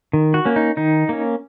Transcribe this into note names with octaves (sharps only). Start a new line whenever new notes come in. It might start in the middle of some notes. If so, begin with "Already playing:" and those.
D#3
F#4
A#3 C#4
D#4
D#3 D#4
A#3 C#4